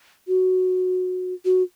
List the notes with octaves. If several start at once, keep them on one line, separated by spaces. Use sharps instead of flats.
F#4
F#4